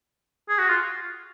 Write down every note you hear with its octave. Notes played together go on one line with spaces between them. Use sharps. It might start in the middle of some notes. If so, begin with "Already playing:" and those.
G#4
F#4
F4